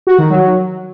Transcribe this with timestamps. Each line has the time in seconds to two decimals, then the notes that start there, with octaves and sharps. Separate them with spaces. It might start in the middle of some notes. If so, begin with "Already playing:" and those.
0.07 F#4
0.18 D#3
0.30 F#3